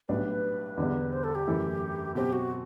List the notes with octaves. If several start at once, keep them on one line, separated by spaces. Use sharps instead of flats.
B1 A2 G3 D4 B4
E2 D3 G3 B3 D4
C5
A4
G4
F#2 E3 A3 E4 A4
B2 F#3 C4 G4
F#4